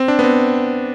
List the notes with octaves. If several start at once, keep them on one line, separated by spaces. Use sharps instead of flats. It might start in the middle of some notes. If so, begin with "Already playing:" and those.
Already playing: C4
D4
B3
C4